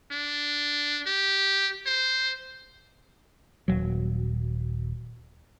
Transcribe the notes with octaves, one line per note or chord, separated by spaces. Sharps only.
D4
G4
C5
D#1 F#3